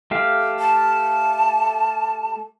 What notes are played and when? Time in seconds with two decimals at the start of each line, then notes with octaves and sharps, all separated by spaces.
0.11 A3 G4 F5
0.59 A5